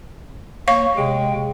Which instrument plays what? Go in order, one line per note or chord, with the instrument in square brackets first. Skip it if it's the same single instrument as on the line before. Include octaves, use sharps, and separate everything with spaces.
[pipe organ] A#3 [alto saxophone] C#5 [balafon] F5 C#6
[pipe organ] C3 G5 [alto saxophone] G#3